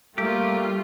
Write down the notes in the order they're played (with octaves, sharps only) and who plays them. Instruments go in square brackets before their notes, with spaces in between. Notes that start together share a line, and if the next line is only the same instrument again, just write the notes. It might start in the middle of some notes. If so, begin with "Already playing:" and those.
[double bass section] G3 [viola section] A3 F4 [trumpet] A#3 [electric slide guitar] G4